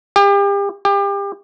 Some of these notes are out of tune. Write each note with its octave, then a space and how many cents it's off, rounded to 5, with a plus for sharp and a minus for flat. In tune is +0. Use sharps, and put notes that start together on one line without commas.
G4 +35
G4 +30